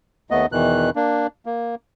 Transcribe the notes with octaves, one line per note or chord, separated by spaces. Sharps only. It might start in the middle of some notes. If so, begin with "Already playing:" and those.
D#2 A3 B3 D#5
E2 B2 D#3 E3 F#6
A#3 D4
A#3